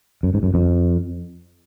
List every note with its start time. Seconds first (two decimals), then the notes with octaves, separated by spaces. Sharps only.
0.23 F#2
0.34 G#2
0.43 F#2
0.54 F2